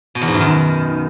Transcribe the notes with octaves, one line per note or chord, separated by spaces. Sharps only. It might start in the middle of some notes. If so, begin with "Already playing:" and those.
B2
E2
G#2
F#2
D#3